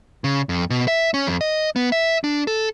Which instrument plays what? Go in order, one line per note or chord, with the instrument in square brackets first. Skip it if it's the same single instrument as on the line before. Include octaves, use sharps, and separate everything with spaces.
[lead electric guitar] C#3
F2
B2
E5
C#4
F2
D#5
B3
E5
D4
A4